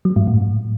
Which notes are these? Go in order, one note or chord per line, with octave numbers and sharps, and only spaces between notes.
F#3
G#2
A2